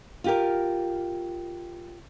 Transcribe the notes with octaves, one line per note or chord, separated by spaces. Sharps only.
F4 G4 A#4